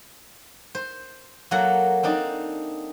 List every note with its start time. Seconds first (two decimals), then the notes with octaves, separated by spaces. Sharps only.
0.75 C5
1.51 F#3 A#3 A4 F#5 A#5
2.03 C4 D4 D#4 D5